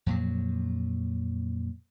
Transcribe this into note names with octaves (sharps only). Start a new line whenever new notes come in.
F2 A#2 F#3